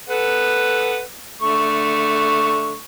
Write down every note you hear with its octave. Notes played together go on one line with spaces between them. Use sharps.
A4 B4 F#5
D3 A3 C#6